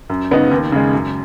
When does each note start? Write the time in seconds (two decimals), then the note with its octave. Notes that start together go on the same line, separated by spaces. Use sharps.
0.10 F#2
0.31 C#3 B3 D#4
0.51 D#2
0.72 C#3 G#3
0.93 F#2